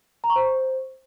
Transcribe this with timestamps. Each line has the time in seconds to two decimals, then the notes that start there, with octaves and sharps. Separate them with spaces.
0.24 A#5
0.30 C#6
0.36 C5